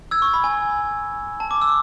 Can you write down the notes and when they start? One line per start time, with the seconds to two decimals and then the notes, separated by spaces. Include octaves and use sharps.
0.11 E6 G#6
0.22 C#6
0.34 B5
0.44 G#5
1.40 A5
1.51 D6
1.61 E6